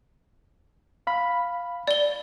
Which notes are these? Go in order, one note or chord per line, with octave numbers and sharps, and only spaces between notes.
F5 B5
D5 G7